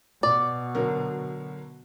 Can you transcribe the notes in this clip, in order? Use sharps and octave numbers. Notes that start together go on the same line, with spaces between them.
B2 D5
D3 F#3 A#4